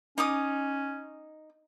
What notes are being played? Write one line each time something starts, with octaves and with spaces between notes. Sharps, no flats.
C#4 D#4 D6 D#6